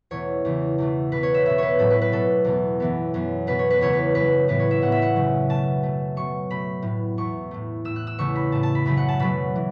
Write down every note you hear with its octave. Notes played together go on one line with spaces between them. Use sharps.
E2 B2 A3 C#5
E2 C#3 E3
E2 B2 A3
B2 B3 B4
C#5
E5
B2 B3 E5
B4 C#5
A2 F#3 A3 A4
B4
B4
B2 B3 A4
E2 B2 B3
F#2 E3 B3
F#2 F#3 B3
B2 B3 B4
C#5
B4
E2 C#3 A3 C#5
B4
F#2 F#3 A3 B4
A2 E3 B3 B4
C#5
E5
A2 F#3 B3 F#5
E5
F#5
F#2 C#3 F#3 A3
B2 A3 A5
B2 A3
B2 F#3 B3 C#6
B2 A3 B5
A2 F#3 B3
E2 B2 A3 C#6
A2 A3
A2 A3 E6
F#6
E6
E2 C#3 A3 C#6
B5
A2 A3 A5
A5
B5
F#2 C#3 F#3 A3 B5
F#5
A5
B2 F#3 A3 B5
E3